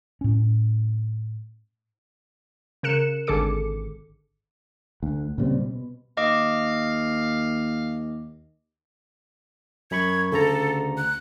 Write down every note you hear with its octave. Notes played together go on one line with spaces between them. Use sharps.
A2 C#4
C#3 A#4 F#6 C#7 E7
G#1 D3 G#4 A4 D6 C#7
D2
A#2 C#3 G3 C4
B2
D#2 D#5 F5 D6
F#2 B5 C#6 G#6
D2 C#3 A4 A#5
F#6